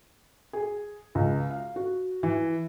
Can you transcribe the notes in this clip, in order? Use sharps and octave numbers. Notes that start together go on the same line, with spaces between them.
G#4
C#2
F5
F#4
E3